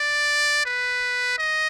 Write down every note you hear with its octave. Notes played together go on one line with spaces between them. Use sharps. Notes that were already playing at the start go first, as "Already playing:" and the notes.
Already playing: D5
B4
D#5